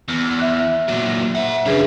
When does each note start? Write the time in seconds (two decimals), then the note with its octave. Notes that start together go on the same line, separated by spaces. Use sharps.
0.08 E2
0.39 E5 F#6
0.88 A#2 F#3
1.35 C5 E5 F#5
1.66 F#2 C#3 D4 G#4 B4